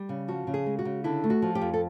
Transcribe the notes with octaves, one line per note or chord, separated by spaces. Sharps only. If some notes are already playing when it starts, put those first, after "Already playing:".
Already playing: G3
C#3
F3 F#4
C#3
G#4
G#3
F#4
C#3
D3 E4
A3
F#4
F3
G4
F2
A4